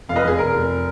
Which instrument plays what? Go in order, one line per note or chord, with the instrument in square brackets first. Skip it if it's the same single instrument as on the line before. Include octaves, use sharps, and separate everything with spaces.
[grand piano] F1 F5
B4 D#5
F1 G#4
F1 A#4
F1